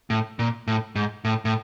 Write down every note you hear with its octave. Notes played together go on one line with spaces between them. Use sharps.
A2
A#2
A2
G#2
A2
A2